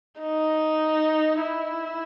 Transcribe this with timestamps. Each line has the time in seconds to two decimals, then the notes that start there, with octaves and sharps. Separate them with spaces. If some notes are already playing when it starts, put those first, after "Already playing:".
0.20 D#4
1.41 E4